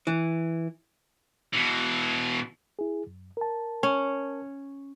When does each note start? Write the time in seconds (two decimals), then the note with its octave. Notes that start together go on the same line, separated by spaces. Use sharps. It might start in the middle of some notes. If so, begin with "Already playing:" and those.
0.07 E3
1.53 B2 E3
2.79 E4 G#4
3.07 F#2
3.37 A#4 A5
3.83 C#4